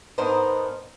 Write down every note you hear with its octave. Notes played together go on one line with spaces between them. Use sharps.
G#2 B3 D4 D#4 A#4 C5